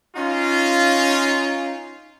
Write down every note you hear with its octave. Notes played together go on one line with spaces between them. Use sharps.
C#4 D#4 F4